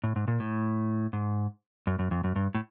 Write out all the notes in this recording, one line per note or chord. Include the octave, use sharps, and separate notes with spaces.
A2
G#2
A#2
A2
G#2
F#2
F#2
F2
F#2
G2
A2